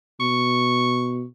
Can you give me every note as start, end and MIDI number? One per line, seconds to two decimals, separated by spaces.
0.20 1.23 47
0.20 1.24 85